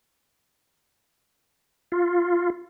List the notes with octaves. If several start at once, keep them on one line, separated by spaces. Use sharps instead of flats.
F4